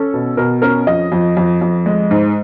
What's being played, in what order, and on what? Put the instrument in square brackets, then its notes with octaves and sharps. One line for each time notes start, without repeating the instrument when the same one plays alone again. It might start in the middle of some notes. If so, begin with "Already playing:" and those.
Already playing: [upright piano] C#4 A4
B2
B2 A#4
C#4 A#4
F2 D#5
F2
F2
F2
G#3
G#2